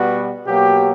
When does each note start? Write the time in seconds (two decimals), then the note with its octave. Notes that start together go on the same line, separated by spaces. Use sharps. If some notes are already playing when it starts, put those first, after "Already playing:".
Already playing: B2 G3 B3 F#4
0.45 B2 F#3 A#3 G4